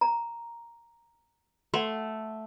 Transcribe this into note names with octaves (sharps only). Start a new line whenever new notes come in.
A#5
A3 F#5 C6